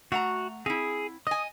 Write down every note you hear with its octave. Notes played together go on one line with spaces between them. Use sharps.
A3 F#4 F#5 A#5
C4 E4 G#4
D#5 G#5 D#6